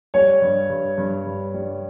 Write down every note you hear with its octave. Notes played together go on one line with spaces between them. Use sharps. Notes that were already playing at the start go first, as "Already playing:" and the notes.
G3 C#5
G2
G2
G2
G2
G3